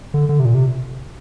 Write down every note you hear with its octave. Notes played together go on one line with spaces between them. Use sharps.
D3
D3
C3
A#2
C3